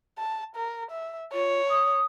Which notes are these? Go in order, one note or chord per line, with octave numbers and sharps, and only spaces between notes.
A5
A#4
E5
F4 C#5
D#6